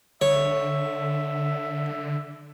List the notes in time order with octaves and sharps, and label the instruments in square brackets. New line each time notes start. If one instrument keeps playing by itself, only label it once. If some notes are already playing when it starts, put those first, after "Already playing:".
[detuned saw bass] D3 [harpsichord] C#5 [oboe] E5